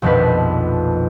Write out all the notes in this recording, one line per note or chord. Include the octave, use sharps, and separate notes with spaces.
A#1 F2 B2 D#3 D4 B4